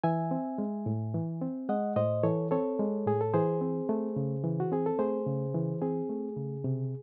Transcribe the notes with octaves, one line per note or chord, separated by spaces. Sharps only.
E3 E5 G#5
C4
G#3
A2
E3
C4
G#3 D#5 F#5
A2 C5 D#5
E3 A4 C#5
C4 A4 C#5
G#3
A2 G#4
A4
E3 G#4 C5
C4
A3
C#3
E3
F#4
C4 G#4
A4
A3 G#4 C5
C#3
E3
C4 G#4
A3
C#3
C3